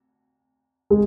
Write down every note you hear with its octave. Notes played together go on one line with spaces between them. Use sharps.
G#3